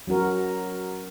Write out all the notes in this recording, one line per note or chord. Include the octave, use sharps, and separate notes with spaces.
F#3 C#4 F#4 A#4